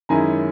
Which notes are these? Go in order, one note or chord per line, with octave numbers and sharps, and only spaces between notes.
F#2 D#3 G#3 C#4 E4 G#5 A#5